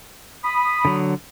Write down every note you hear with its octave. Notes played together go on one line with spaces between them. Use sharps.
B5 D#6
D3 F#3